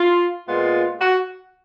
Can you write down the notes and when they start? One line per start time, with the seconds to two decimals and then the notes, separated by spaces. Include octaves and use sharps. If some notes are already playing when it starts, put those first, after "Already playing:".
Already playing: F4
0.47 A#2 G#3 B3 F4
1.01 F#4